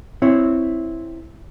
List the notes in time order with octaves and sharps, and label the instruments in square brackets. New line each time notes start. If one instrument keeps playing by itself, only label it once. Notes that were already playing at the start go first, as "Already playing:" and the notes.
[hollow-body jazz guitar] C4 E4 C#5